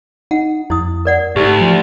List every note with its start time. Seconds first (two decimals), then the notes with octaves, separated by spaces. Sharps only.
0.31 D#4 F#5
0.70 F2 E4 D#6
1.05 A#4 D5 F#5
1.36 D2 G#2 D#4 G4
1.61 F3